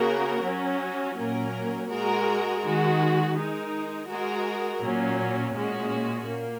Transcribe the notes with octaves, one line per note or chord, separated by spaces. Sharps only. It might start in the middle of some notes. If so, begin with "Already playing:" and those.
Already playing: C#3 A#3 F#4 A#4
F#3 C#4 F#4
A#2 F#3 A#3 C#4 A#4
G#3 F#4 A#4
D#3 G#3 F#4
G#3 D#4 A#4
G#3 F#4 A#4
A#2 F#3 C#4
A#2 G#3 C#4 F#4
A#2 A#3